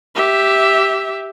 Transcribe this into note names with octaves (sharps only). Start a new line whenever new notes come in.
G4 E5